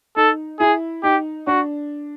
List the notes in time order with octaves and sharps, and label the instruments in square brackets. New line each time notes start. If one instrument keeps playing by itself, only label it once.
[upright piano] D#4 [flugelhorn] A4
[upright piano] E4 [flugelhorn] G#4
[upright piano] D#4 [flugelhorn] G4
[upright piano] D4 [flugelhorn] F#4